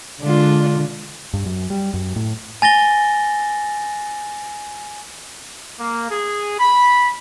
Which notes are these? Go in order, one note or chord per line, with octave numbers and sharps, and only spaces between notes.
D3 G#3 D4 F4
G2
F#2
G3
F#2
A2
G#5 A6 A#6 G7
A#3
G#4
B5